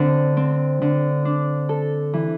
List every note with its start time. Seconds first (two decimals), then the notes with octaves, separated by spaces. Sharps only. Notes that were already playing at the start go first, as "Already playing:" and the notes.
Already playing: D3 C4
0.37 C4
0.82 D3
1.25 D4
1.69 A4
2.14 E3